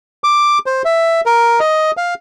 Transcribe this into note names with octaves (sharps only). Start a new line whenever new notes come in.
D6
C5
E5
A#4
D#5
F5